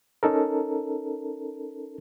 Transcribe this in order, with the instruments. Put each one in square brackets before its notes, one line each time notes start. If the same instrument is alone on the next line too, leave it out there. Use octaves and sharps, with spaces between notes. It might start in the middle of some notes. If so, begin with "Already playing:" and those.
[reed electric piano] C#4 D#4 A4 A#4